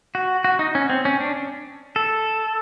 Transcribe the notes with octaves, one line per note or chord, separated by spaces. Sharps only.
F#4
F#4
D#4
C#4
C4
C#4
D4
A4